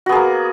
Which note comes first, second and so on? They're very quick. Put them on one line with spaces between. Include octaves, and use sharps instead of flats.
F#4 B3 G#4 A#3